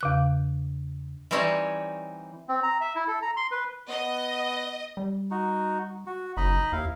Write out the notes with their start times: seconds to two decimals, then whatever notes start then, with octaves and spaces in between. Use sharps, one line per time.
0.01 E2 C#3 F#6
1.31 E3 G3 C4 D#4 C#5
2.49 C4
2.63 A#5
2.81 E5
2.95 E4
3.07 A4
3.22 A#5
3.37 C6
3.51 B4
3.89 B3 D#5
4.97 G3
5.31 D#4 F#4
6.07 F#4
6.37 F#1 D#4 D#5 B5
6.72 D#2 E4 F5